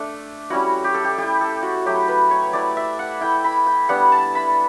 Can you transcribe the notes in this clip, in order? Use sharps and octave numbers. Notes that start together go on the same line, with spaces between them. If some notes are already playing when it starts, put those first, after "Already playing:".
Already playing: A3 D4
G3 C#4 E4 F#4
G4
A4
G4
A3 E4 G4
A4
F#4
F#3 A3 E4 G4
B4
C#5
A3 E4 D5
E5
F#5
A3 E4 G5
B5
G5
G3 B3 D4 F#5
A5
B5